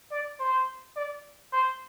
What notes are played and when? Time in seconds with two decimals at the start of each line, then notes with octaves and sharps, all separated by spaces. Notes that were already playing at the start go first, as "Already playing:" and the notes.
0.11 D5
0.40 C5
0.96 D5
1.53 C5